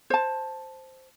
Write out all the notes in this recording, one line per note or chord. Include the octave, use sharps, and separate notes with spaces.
C5 A5